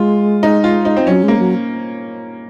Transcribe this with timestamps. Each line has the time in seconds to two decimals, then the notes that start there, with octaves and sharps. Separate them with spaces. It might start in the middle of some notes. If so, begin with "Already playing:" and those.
Already playing: G#3 F4
0.43 D#4
0.64 F4
0.85 D#4
0.97 C4
1.07 F#3 C#4
1.23 G#3 A#3
1.39 F#3